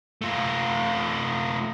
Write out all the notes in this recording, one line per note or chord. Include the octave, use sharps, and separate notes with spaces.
A3 F4